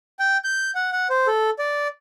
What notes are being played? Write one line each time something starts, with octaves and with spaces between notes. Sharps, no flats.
G5
G6
F#5
F#5
C5
A4
D5